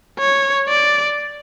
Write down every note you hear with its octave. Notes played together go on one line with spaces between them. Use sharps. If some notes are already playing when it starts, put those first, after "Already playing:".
C#5
D5